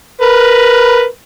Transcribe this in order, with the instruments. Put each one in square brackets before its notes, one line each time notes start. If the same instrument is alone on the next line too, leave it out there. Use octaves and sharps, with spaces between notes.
[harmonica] A#4 B4